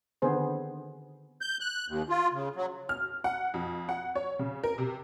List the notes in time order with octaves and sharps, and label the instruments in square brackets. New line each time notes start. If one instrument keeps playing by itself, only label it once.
[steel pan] D3 D#3 B3 C4 G#4 C5
[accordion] G6
F#6
D#2
F4
C#3
F#3
[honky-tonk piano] F6
F#5
F2
F#5
C#5
C#3
A#4
C3